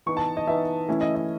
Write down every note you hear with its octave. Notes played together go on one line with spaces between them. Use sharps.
E3 B3 D#4 C#6
A5
D#5
E3 B3 D#4 E5
E3 A3 C#4 E4
D#5
D#5